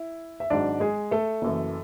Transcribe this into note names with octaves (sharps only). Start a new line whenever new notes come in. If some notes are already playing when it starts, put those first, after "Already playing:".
Already playing: E4
E5
G#1 G#2 F#3 D4 D5
G#3 G#4
A3 A4
F#1 F#2 E3